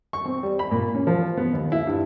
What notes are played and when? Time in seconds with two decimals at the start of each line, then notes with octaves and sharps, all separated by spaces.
0.13 C#6
0.26 C4
0.43 G3
0.59 B5
0.71 A#2
0.95 C#4
1.07 F3
1.37 B3
1.53 D#2
1.72 E4
1.87 G2